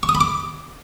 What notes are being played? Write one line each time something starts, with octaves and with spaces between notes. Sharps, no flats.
C#6
D#6
B5
D6